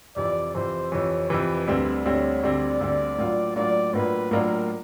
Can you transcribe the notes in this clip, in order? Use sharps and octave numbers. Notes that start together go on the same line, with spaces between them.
F2 C3 E3 D5
F2 C3 E3 C5
F2 C3 E3 C#5
F2 C3 E3 B4
D2 D3 G3 C4 B4
D2 D3 G3 C4 C#5
D2 D3 G3 C4 D5
D2 D3 G3 C4
A2 F#3 A#3 D4 F4
A2 F#3 A#3 D4 F4 D5
A2 F#3 A#3 D4 F4 B4
A2 F#3 A#3 D4 F4 A#4